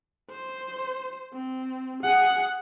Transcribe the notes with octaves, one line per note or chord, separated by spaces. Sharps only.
C5
C4
G#4 F#5